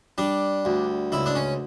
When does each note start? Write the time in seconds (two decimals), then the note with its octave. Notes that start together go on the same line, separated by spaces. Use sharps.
0.18 G3 D4
0.65 D2
1.12 C#2 E4
1.26 D4
1.35 C#4